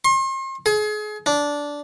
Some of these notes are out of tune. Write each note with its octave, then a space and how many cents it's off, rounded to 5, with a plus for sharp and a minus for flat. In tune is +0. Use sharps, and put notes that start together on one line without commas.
C6 +40
G#4 +35
D4 -10